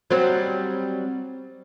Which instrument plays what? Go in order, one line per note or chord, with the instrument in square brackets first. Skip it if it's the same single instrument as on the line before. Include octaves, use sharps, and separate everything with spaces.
[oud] F#3 G3 C4